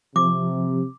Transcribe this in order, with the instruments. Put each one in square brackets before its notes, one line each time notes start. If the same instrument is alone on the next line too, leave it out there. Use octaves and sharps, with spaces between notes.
[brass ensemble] C3 [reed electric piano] F3 [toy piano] D6